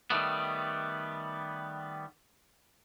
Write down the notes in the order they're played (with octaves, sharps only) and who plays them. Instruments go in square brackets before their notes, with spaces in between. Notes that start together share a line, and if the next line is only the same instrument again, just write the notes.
[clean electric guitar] D#3 G3 A3 B3